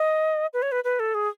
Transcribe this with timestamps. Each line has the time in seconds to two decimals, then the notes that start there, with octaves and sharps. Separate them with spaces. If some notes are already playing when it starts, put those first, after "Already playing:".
Already playing: D#5
0.53 B4
0.62 C#5
0.72 B4
0.84 B4
0.99 A4
1.14 G#4